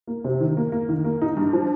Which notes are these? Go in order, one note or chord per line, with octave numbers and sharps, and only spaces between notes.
A#3
C3
D#3
A#3
A#3
D#3
A#3
D#4
G2
F3